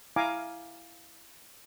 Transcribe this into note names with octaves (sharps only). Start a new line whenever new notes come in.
E4 F5 G#5 A#5 D6